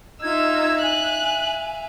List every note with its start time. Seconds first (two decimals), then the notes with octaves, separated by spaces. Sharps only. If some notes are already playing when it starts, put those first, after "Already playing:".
0.22 D#4 F4 E5 F5 E6 G#6
0.82 G#5 F#6